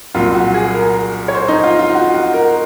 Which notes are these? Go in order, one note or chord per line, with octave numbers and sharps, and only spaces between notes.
C2 A#2 F#3 F4
F#4
G#4
A#4
C#5
C5
D#4
F4
F4
F#4
F#4
A#4